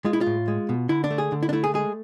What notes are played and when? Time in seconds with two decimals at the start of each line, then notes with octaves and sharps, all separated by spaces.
0.05 G#3 F4
0.13 E4
0.21 F4
0.26 A2
0.48 G#3
0.69 B2
0.89 D3 E4
1.04 D4
1.11 A3
1.18 G#4
1.32 D3
1.43 E4
1.49 D4
1.53 A3 E4
1.64 G#4
1.74 G#3 G#4